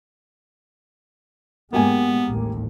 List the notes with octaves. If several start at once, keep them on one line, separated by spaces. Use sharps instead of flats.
G#2 G#3 A#3 B3 G4 G#5
A1 D#2